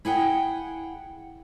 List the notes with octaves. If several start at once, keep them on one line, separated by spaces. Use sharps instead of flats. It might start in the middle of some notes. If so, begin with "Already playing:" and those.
E4 G#4 F#5 G5